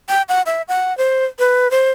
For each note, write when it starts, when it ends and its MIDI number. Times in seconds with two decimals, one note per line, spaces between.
0.09 0.22 79
0.29 0.42 78
0.46 0.62 76
0.68 0.96 78
0.98 1.26 72
1.39 1.71 71
1.71 1.91 72